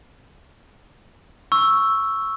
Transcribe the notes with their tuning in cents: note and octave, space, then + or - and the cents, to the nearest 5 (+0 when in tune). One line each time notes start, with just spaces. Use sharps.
C#6 +0 E6 +0